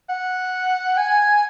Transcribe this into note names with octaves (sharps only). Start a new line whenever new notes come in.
F#5
G#5